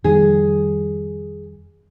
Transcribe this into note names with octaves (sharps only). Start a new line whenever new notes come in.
F2 D#3 G3 G#4